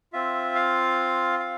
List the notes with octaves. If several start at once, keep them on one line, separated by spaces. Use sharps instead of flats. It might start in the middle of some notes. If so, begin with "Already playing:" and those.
C4 F4 E5
F5
F5